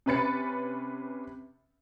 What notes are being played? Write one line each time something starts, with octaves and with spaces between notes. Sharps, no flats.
C3 C#4 B4 B5 A6 C#7